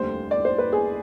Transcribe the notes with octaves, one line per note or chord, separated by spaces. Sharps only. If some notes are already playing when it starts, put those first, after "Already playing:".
Already playing: F1 D#2 D3 G3 C5
D5
C5
B4
G#4